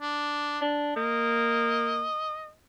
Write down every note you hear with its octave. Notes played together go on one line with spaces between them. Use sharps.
D4
D4
A#3 D#5